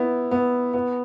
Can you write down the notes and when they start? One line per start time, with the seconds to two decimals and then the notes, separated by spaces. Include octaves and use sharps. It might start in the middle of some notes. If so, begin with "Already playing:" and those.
Already playing: B3 E4
0.31 B3
0.74 B3